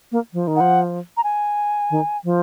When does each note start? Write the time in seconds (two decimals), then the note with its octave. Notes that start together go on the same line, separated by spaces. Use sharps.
0.12 A#3
0.33 F3
0.47 D#3
0.56 F3 F#5
1.17 A#5
1.24 G#5
1.90 D#3
2.24 F3